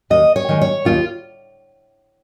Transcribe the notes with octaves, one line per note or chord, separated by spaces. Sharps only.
D#2 D#5
C#5
D#3 G#3
C#5
D#2 F4